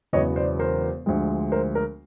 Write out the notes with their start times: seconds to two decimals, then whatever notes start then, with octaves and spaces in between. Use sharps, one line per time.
0.13 E1 E2 C#3 F#3 B3 C#5 D#5
0.36 C5 D5
0.59 A#4 C5
1.06 D2 D3 F3 G#3
1.52 A#4 C5
1.75 A#4